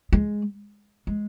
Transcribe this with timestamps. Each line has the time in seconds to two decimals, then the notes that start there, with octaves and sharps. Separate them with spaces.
0.13 G#3
1.07 G#3